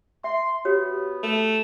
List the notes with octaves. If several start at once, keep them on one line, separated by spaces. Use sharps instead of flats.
E5 C6
B3 F#4 G4 C#5
A3